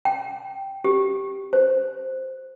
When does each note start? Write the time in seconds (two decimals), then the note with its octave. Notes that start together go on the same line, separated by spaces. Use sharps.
0.05 G5
0.84 G4
1.53 C5